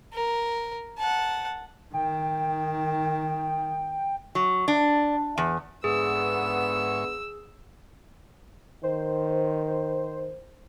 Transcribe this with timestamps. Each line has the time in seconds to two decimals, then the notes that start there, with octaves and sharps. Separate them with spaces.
0.14 A#4
0.98 F#5 A5
1.94 D#3 G5
4.35 F#3
4.68 D4
5.38 E2
5.84 G#2 D3 B3 G#4 E5 C#6 E6
8.83 D#3 C5